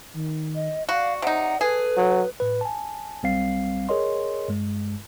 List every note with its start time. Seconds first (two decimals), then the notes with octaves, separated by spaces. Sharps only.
0.14 D#3
0.55 D#5
0.89 F#4 D5 F5
1.22 C3 D#4 F#5
1.61 G#4 A4 B4
1.97 F#3
2.40 A2 B4
2.61 G#5 A5
3.23 B1 G3 C4 F5 C7
3.89 G#4 A#4 C#5 D#5 C6
4.48 G2 G#3